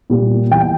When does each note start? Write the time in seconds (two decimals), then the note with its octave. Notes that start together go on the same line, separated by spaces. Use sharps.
0.10 A#2 G3
0.51 E2 G5